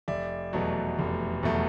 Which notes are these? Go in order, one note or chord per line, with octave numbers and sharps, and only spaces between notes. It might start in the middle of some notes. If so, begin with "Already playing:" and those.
F1 D5 E5
E2 B2 F#3 A3
F1
E2 B2 F#3 A3